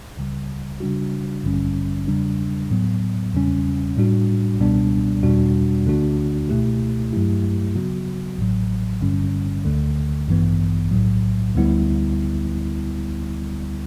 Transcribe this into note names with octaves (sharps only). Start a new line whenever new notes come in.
C#2 C#3 G3
C#3 G3 D4 F#4
A1 G2 D3 G3 C#4
E2 C#3 G3 D4
A2 F#3 B3
E2 C#3 G3 C#4
A2 G3 D4 F#4
C#2 B2 G3 B3 D4
E2 B2 G3 D4 F#4
D2 D3 A3 D4 F#4
C#2 B2 A3 E4 G4
G2 F#3 A3 E4 G4
C#3 F#3 B3 F#4
A1 A2 F#3
G1 G2 D3 G3 C#4
D2 D3 A3
A1 G2 E3 B3
B1 A2 F#3
D2 D3 G3 B3 E4